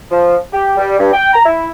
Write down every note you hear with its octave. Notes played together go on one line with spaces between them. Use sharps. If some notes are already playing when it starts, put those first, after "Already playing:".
F3
G4
G3
G2
G5
A#5
E4